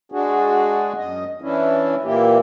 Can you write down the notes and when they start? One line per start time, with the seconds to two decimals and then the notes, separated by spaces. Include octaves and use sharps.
0.12 G#3 D4 F#4 G#4
0.97 F#2 D#5
1.42 E3 C#4 D4 E4
2.04 A#2 E3 A#3 E4 G4